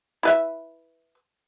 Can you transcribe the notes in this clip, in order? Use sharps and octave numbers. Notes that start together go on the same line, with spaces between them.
E4 B4 E5